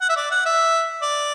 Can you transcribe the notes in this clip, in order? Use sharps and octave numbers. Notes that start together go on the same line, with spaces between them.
F#5
E5
D5
F#5
E5
D5